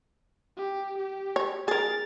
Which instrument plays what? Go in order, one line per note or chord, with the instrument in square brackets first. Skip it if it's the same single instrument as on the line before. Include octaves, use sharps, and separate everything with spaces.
[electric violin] G4
G4
[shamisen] C#5
[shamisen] G#4 A#4 [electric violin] A6